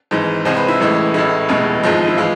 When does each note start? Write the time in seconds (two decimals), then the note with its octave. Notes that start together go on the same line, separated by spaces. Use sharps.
0.11 G#1 G#2 E3
0.45 C2 C3 G#3 C5
0.57 B4
0.68 E4
0.80 A1 A2 E3 G#3
1.14 A1 A2 G#3 E4
1.49 F1 E2 B2 G#3
1.83 G#1 G#2 F3 G#3
2.08 E4
2.17 E3 G#3 F4